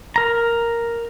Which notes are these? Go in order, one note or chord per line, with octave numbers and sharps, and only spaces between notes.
A#4 A#5